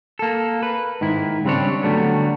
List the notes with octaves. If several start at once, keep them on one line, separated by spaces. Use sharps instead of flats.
A#3 A4
B4
G#2 D#3 E4
C#3 G3 C4 D4 C#5
D3 F#3 G3 A3 B3